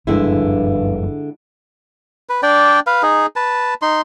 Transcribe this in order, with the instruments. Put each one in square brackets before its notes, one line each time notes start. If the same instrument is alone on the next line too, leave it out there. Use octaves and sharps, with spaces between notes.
[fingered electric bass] F#1 F3 G3 [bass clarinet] G2 [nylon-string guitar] D3 G#3 E4
[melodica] B4
D4 D5 G5
B4 F5
D#4 G#4
B4 A5
D#4 C6